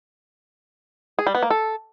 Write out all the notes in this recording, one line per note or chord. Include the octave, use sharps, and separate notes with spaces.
G#4
G3
B3
A#3
A4